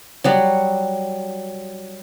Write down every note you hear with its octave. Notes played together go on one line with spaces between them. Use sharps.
F#3 G3 F#4